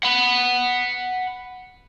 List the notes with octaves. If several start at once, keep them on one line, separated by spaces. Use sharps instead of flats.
F#5 B5